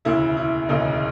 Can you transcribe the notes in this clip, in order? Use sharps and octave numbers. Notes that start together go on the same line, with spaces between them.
E1 D2 C#3 E4
E4
E1 D2 C#3 D#4